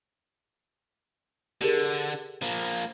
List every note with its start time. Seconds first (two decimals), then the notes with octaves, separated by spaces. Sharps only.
1.62 D3 G4 G#4 A#4
2.42 F3 A#3